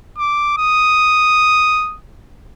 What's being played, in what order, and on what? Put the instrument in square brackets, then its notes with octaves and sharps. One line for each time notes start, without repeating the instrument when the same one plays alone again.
[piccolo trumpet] D6
D#6